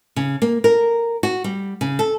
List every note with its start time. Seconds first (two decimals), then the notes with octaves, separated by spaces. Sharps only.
0.16 C#3
0.42 A#3
0.64 A#4
1.23 F#4
1.44 G3
1.81 C#3
1.99 A4